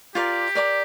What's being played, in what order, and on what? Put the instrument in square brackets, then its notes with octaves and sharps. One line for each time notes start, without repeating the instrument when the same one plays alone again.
[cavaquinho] F4 A#4 D5 F5 [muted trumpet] G4
[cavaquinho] A#4 D5 A#5 D6